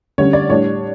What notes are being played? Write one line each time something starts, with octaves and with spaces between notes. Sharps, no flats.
D3 G3 C#4 C#5
D5
A2 G3 D4 C#5